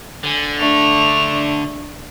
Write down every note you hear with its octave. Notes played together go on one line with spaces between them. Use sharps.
D3 G#5
A3 D4 F7